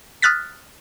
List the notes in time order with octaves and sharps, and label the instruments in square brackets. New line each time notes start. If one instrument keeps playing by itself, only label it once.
[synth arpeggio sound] D#6 F6 F#6 A6 B6